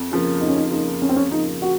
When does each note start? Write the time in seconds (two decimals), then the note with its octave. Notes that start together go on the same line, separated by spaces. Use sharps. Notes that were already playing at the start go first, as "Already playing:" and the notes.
Already playing: F2
0.12 C#3 F3 A#3
0.41 F2 D#4
0.48 C#4
0.56 D#4
0.71 C#3 F3 A#3 D#4
1.02 F2 C#4
1.09 C4
1.16 C#4
1.31 C#3 F3 A#3 D#4
1.62 F#4